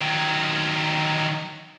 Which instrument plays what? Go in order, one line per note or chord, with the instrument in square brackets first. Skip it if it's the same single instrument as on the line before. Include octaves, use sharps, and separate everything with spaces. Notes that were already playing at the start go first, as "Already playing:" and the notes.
[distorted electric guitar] D#3 F#3